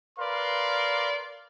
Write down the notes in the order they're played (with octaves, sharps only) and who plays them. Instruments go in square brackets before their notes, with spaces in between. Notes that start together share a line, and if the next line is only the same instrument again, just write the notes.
[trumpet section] A#4 B4 D5 F5 C6